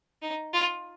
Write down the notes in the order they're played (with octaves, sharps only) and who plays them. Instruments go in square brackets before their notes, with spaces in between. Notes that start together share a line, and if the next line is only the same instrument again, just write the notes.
[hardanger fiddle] D#4
F4